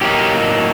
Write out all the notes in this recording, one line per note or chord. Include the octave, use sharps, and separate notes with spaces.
A2 F#3 A#3 D#4 G4